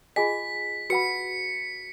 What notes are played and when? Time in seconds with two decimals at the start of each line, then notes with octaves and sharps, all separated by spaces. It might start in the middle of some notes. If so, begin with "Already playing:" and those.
0.16 F4 G#4 D#5 G#5 B6
0.90 F#4 B4 F#5 B5 C#7